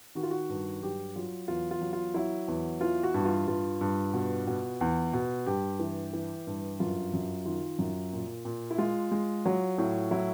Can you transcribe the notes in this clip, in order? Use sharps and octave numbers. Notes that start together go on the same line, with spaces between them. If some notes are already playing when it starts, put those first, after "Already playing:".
D#3 F#4
F4
F#4
G2
F#3 G4
F#3 F4
E2 F4
F4
F#3
F4
F#3 E4
E2
E3 F4
F#4
G2
F4
G2 F4
G2
B2
B2
E2
B2
G2 G4
E3
E3
G2
F#2 F4
F#2
D#3 F4
F#2
A#2
A#2
E4
G#3 F4
G#3
F#3
A2
F#3 E4